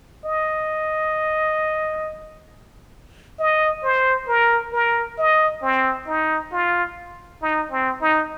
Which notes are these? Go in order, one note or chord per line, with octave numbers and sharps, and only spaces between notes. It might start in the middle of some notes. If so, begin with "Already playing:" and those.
D#5
D#5
C5
A#4
A#4
D#5
C4
D#4
F4
D#4
C4
D#4